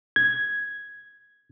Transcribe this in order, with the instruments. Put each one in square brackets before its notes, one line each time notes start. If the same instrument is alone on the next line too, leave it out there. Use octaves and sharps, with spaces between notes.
[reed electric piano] G#6